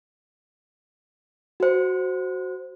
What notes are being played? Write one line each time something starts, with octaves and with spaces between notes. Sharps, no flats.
F#4 C5